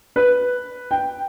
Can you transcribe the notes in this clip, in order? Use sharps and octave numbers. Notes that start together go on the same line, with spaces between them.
B4
G5